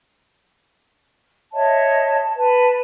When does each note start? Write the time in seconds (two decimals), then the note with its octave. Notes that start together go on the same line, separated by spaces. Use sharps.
1.54 C#5 D#5 E5 A5
2.22 A5
2.36 B4 A5